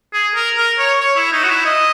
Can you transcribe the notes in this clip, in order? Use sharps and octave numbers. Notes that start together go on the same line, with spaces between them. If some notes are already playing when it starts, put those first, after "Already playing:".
G#4
A#4
A#4
C#5
C#5
E4
D#4
F#4
E4
D#5